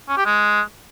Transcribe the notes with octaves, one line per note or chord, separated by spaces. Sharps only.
C#4
G4
G#3